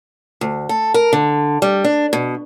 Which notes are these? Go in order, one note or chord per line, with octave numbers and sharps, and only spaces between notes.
D2
A4
A#4
D3
G3
D4
B2